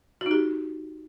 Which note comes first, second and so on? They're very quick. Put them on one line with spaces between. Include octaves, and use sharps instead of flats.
F#4 D#4 G4